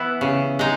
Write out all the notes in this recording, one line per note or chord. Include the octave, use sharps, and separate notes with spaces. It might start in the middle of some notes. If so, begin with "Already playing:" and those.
Already playing: E3 B3 E4
C#3
G#3 D#4